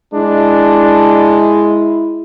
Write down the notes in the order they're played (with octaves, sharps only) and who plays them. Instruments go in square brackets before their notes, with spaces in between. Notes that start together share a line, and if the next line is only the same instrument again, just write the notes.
[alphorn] G#3 [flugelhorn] D4 [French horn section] E4